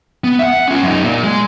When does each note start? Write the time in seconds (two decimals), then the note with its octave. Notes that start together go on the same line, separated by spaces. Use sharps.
0.24 B3
0.39 E5 F#5
0.68 C#4 F4
0.83 F#2 D#4
1.04 A#2
1.24 G#3